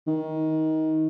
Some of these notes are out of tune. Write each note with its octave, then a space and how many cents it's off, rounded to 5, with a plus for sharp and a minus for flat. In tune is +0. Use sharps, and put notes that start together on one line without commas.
D#3 +20